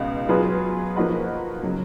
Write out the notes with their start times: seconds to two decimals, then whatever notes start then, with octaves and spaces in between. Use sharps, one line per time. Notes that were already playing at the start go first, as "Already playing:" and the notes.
Already playing: C#2 B2 D#4
0.29 F#3 B3 F4 G#4 B4
0.96 F3 A#3 D#4 F#4 B4
1.63 C#3 F#3